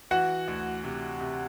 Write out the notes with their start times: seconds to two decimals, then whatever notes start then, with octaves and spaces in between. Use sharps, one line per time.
0.11 E3 F#4 F#5
0.48 D2
0.84 C3
1.20 C3